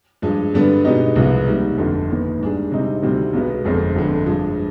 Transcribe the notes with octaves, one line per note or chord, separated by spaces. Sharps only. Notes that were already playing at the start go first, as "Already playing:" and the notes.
G2 F3 G#3
G2 D3 G3 B3 D4
B2 G#3 B3 D#4 G4
C2 C3 F3 G#3 B3
D#2 D#3 G3
G1 F2 D3
D#2 D#3 B3
G#2 G3 D4 G#4
C3 G3 C4 D#4
D2 C3 D#3 G3 C4
B1 B2 G#3 B3
G1 F2 D3 G#3 C4
G1 F2 D3
G2 F3 G#3